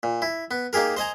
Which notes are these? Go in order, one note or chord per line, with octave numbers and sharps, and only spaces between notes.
A#2
E4
B3
A#3 D#4 G4 G#4 A#4
C5 D#5 G#5 A#5